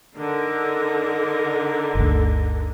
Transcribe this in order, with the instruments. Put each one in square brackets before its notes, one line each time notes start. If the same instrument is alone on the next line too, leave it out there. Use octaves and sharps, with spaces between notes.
[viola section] D3 [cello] D#4 A#4
[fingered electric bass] G1 D2